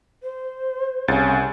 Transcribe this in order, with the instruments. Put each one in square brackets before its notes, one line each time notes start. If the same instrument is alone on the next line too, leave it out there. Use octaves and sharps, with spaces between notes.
[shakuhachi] C5
[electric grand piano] C2 A6 [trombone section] C#3